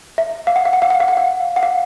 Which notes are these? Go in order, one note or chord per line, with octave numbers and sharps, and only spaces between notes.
E5
F5
F#5
F5
F#5
F5
F#5
F5
F#5
F5
F#5
F5